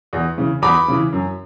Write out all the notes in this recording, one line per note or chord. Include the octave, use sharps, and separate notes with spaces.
E2
C#3 E3
E2 B5 D6
C#3 E3
F#2